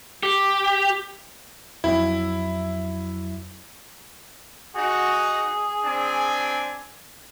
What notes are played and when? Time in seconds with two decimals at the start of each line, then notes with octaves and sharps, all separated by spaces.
0.23 G4
1.84 F2 F#3 E4
4.75 D#4 F#4 G#4
5.84 C4 D4 G#5